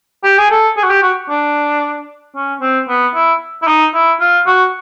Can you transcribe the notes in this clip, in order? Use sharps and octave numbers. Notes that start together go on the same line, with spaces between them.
G4
G#4
A4
G#4
F#4
G4
F#4
D4
C#4
C4
B3
E4
E4
D#4
E4
F4
F#4